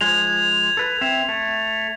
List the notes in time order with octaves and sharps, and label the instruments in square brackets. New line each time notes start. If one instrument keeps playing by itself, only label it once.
[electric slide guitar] F3 G#3 [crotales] G#6 F7
[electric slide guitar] A4 B4
C4 E5
A3